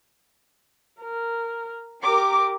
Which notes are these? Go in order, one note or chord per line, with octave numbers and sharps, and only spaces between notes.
A#4
G4 A#4 D6